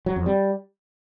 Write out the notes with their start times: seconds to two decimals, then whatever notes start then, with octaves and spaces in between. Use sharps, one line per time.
0.06 F#3
0.16 F2
0.26 G3